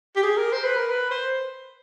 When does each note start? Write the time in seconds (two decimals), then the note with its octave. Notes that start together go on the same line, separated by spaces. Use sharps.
0.16 G4
0.23 G#4
0.37 A#4
0.53 C5
0.64 B4
0.77 A#4
0.89 B4
1.11 C5